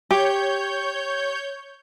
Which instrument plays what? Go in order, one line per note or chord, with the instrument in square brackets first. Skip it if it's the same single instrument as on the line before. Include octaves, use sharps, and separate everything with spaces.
[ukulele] G4 [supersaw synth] C#5 G6